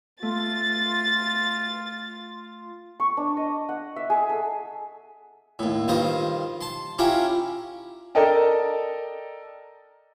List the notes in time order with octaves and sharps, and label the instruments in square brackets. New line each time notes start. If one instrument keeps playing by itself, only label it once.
[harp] A3 [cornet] F4 [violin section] A6
[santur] C#6
D4
D#5
F#5
E5
G#4
A4
[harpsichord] D#2 A2
G2 D#3 F4 C5 D#5
A5 C6
C#4 E4 F4 G4 A#5
[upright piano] A4 A#4 D5 D#5 G5 A5